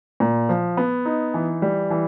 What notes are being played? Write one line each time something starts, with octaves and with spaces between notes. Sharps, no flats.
A#2
F3
B3
D#4
E3
G3
E3